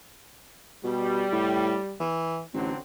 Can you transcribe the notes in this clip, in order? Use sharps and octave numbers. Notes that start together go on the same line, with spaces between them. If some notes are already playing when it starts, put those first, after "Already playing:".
B2 G3
A2
E3
A1 D3 F#3 C4